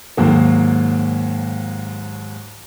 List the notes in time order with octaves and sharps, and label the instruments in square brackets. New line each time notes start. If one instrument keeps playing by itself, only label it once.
[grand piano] D#2 G#2 F#3 A#3